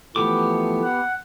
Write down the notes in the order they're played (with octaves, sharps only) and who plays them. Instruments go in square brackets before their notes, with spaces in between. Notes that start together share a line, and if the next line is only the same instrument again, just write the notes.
[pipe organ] E3 F3 A3 [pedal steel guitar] B3 G4 D6
[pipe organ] F#5